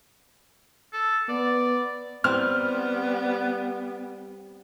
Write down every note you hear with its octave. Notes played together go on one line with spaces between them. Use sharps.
A4
B3 D5
G3 B3 C4 F6